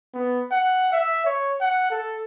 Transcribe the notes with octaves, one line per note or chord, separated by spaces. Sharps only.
B3
F#5
E5
C#5
F#5
A4